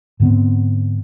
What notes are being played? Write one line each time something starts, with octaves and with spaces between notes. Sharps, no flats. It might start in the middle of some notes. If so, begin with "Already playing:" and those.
G#2 D3 B3 C4